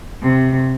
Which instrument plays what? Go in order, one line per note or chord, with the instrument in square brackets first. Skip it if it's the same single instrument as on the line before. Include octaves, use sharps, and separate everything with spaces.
[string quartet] C3